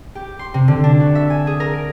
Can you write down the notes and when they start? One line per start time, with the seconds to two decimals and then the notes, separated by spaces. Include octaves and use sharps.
0.15 G4
0.39 C6
0.54 C3
0.68 D3
0.84 D4
1.00 F#4
1.15 E5
1.30 G#5
1.47 G#4
1.60 A#4
1.73 D7